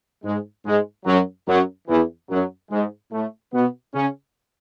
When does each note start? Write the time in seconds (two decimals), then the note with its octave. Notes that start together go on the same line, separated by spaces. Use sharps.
0.24 G#2 G#3
0.65 G#2 G#3
1.05 F#2 F#3
1.48 F#2 F#3
1.88 E2 E3
2.30 F#2 F#3
2.70 G#2 G#3
3.12 A2 A3
3.53 B2 B3
3.94 C#3 C#4